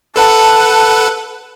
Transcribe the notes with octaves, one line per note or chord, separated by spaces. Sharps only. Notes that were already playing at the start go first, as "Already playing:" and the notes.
A4 B4 F#5 A5